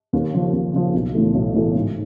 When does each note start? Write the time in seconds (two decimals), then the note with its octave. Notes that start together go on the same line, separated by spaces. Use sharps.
0.13 D#2
0.34 C#3 F3
0.53 D#2
0.73 C#3 F3
0.94 B1
1.14 A2 E3 A3
1.34 B1
1.54 A2 E3 A3
1.75 G#2